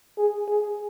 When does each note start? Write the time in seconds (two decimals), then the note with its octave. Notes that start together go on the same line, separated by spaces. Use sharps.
0.18 G#4
0.48 G#4